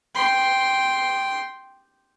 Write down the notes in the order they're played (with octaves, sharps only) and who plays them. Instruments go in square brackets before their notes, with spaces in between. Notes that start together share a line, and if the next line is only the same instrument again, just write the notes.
[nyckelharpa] G5 C6